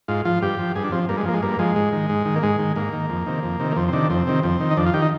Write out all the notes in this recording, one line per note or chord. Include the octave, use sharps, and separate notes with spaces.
G#2 F4
F3 F4
G2 G4
F3
G2 G#4
D4
F3 C4
G2 A#3
G#3
F3 A#3
G#3
G2 A#3
F3 G#3
G#2
D#3
G#2
D#3
A#3
G#2 G#3
D#3
G#2 A#3
D#3
F2
C3 D#3
F2
C3 D#3
A#3
F2 C4
C4
C3 D#3 D4
F2 C4
C3 D#3
F2 C4
D#3
D#4
F2 D4
F4
D#3 G4
D#4